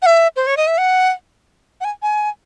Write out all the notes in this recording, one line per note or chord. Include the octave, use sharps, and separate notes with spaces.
F#5
E5
C5
C#5
D#5
E5
F#5
F#5
G#5
G#5